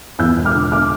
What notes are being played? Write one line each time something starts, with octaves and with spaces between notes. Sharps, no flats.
E2 E6 G6
E1
D6 F6
D3
D6 F6